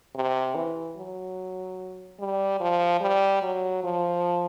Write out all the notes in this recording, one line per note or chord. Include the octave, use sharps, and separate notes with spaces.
C3
E3
F#3
G3
F3
G3
F#3
F3